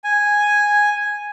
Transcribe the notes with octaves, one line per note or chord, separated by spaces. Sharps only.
G#5